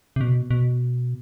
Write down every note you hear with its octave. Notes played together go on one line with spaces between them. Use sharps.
C3
B2
B2